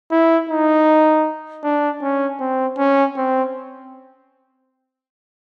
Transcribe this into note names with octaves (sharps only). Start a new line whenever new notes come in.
E4
D#4
D4
C#4
C4
C#4
C4